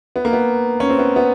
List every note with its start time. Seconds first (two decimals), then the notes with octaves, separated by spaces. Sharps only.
0.16 B3
0.25 A#3
0.33 B3
0.80 C#4
0.90 C4
0.99 B3
1.16 B3